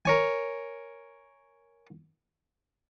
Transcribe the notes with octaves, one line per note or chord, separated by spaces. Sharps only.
A#4 C#5 G#5